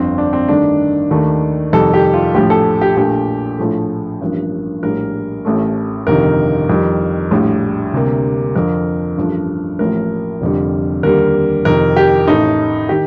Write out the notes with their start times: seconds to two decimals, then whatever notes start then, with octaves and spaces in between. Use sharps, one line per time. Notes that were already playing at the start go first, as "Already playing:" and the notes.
Already playing: G1 F2 D3 C4
0.18 D4
0.33 C4
0.48 G2 D#3 A3 D4
1.11 D#2 D#3 A3
1.73 F2 C3 D#3 G3 A4
1.93 G4
2.14 F4
2.34 A#1 A2 F3 G4
2.50 A4
2.81 G4
2.97 A#1 A#2 A3 G4
3.58 A#1 A2 F3 A3
4.21 A1 G2 F3 A#3
4.83 A#1 A2 G3 A#3 A#4
5.45 A1 A2 A3
6.07 G1 F2 C3 D#3 A#4
6.69 F2 D#3 G3
7.31 A#1 A2 G3
7.93 D2 C3 G3 A#3
8.55 F2 D3 F3 A#4
9.17 A1 G2 F3 A3
9.79 A1 A2 F3 A#3 A#4
10.41 F1 F2 D3 G3
11.03 D#2 D3 G3 A#3 A#4
11.65 F2 C3 D#3 A#4
11.96 G4
12.27 A1 A2 A3 D#4
12.89 D#3 G4